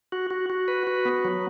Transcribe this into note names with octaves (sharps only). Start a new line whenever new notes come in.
F#4
F#4
F#4
B4
F#4
B3
F#3